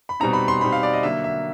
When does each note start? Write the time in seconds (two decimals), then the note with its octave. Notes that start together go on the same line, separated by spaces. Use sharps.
0.09 B5
0.20 B2 G3 C4 D#4 A#5
0.33 B5
0.48 C6
0.61 B2 G3 C4 D#4 B5
0.72 F5
0.83 D5
0.93 D#5
1.03 D3 F#3 A#3 E5
1.24 E5